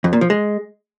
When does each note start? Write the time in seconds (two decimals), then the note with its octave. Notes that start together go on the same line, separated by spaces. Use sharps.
0.04 F2
0.13 A#2
0.21 F3
0.30 G#3